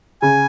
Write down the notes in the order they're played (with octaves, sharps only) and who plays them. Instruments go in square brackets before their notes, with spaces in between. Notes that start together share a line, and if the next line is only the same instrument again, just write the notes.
[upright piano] C#3 [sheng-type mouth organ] G#5